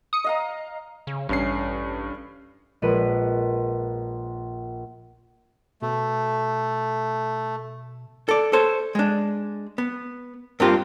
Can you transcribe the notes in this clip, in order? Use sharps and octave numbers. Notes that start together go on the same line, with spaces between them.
D#6 C#7
D#5 F5 A#5
C#3
A1 G2 C#4 C7
A#1 G#3 B4 D#7
B2 A3
A4 D5
A4 C5 C#5
G#3 D4
B3
G2 A#3 C4 D4 F4 G4